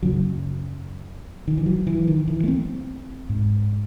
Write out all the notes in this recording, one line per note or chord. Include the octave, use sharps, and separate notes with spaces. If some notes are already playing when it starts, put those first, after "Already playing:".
F#2 C#3 F#3
D#3
E3
F#3
E3
D#3
E3
A3
C4
G#2